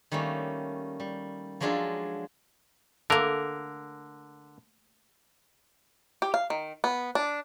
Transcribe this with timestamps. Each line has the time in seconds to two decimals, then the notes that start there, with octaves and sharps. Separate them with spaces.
0.12 D#3 G3 A3 A#3 C#4
1.00 G3
1.61 F3 F#3 G#3 D4 F4 A4
3.10 D3 A3 A#3 A#4
6.22 G4
6.34 F5
6.50 D#3
6.84 B3
7.15 D4